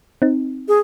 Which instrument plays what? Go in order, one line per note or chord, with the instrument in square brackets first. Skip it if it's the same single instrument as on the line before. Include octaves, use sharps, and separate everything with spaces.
[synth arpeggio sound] C4 D#4
[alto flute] G#4